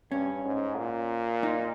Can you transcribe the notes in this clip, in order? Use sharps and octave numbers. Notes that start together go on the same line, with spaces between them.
G2 C#4
G#2
A#2
D#4